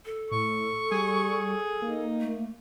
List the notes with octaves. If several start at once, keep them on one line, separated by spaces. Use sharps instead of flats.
A4
A2 C#6
G3 G#4
A#3 D#4
A3